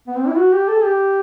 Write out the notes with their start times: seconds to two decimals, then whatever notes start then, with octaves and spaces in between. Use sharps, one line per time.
0.07 B3
0.17 C4
0.27 E4
0.38 F#4
0.53 G4
0.68 A4
0.84 G4